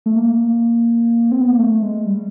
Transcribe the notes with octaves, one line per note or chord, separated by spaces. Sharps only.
A3
A#3
C4
B3
A#3
A3
G#3
G3